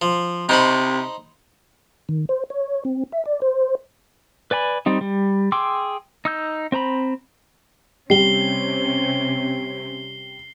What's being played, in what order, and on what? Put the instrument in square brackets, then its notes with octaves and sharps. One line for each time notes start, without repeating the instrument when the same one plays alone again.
[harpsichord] F3
[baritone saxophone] C3 [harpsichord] D#4 C5 B5
[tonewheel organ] D#3
C5
C#5
C4
E5
D5
C5
[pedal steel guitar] B4 D5 G#5 B5
G3 C4 D#4
G3
G#4 G5 C6 D6 E6
D#4 E6 G6
C4 C5 A#5 B5
[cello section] C3 C4 C#4 [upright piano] G3 [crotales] C7 G7